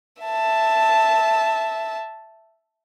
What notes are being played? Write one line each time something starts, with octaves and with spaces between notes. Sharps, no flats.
E5 A5